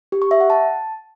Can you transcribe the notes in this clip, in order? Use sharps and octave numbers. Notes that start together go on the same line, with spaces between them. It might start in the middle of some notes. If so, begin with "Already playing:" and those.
G4
C#6
E5
F#5
A5